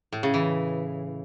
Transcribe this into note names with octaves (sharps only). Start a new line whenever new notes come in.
A2
C#3
E3